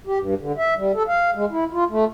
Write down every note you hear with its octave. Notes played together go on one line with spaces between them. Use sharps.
G4
G2
D3
E5
G3
A4
F5
G#3
E4
F4
A3